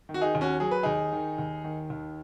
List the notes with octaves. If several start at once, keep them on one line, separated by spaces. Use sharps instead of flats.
D#3
F#4
D#4 G#4
D#2
C#4 F#4
F#3 G#4
B4
D#2 D#4 G#4
D#3
D#2
D#3
D#2